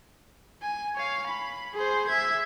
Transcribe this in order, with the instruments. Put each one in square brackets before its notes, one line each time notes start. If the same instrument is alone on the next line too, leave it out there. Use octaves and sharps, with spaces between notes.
[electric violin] G#5
C#5 F5
B5
G#4 C5
E5 G#6